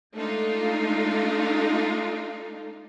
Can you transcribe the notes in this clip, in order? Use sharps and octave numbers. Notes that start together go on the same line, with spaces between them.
G#3 A3 D4 D#4 F4